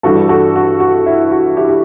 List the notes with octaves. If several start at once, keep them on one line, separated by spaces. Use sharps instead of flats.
G2 E3 G3 F#4 A4
F#4 A4
F#4
F#4
E4
F#4
E4 G4
G4